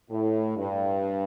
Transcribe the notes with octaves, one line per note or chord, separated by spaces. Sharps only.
A2
G2